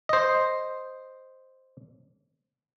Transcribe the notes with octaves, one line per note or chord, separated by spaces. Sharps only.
C5 D#5